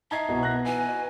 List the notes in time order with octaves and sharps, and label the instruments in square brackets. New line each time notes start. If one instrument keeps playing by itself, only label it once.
[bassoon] D#4 [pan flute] E5 [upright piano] A5 G#6 C7
[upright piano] C2 B2 [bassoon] D#4
[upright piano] B3 F#6 A#6
[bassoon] E3 [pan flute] G#5
[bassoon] B2